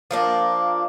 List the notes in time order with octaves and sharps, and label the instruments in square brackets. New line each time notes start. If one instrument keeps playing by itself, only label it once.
[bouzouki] F3 A#3 D4